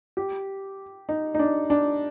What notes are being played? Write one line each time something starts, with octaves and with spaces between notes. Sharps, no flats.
G4
D#4
D#4
D4
D4